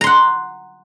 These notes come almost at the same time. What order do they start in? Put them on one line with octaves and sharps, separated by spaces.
A#5 C6 F#5